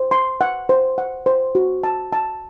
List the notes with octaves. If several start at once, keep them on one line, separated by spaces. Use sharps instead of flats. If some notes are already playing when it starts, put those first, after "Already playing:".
Already playing: C5
C6
F#5
C5
F#5
C5
F#4
A5
A5